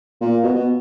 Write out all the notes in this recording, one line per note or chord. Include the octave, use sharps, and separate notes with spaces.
A#2
B2
B2